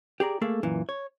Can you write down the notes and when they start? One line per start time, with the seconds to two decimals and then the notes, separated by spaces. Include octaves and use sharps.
0.20 G4 G#4 D5 A#5
0.41 A3 A#3 G#4 A4
0.63 F#2 A#2 E3
0.89 C#5